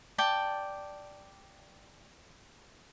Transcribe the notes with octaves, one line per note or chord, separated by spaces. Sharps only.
D5 G5 A5